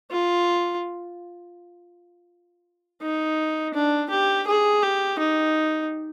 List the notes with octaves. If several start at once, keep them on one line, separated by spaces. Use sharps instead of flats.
F4
D#4
D4
G4
G#4
G4
D#4